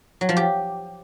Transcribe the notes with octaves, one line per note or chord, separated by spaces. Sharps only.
F#3
F3
G4